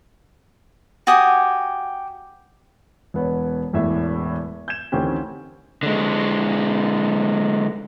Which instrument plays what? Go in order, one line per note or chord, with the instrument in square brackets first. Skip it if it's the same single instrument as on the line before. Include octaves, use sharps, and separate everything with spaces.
[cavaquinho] F#4 G4 G#5 D#6
[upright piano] E1 B3 C#5
E1 E2 A2 E5
G6 G#6 E7
A1 D2 D#3 C4 C#4 G4
[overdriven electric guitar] D3 G#3